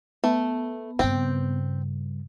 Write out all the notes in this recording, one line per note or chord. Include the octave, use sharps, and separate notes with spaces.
A3 B3
G2 C#3 C4 G5